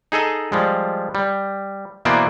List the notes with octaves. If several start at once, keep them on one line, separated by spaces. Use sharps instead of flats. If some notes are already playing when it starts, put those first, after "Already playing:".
D#4 G#4 A4 D#5
F3 G3 G#3
G3
B2 E3 A#3 B3 C5 D5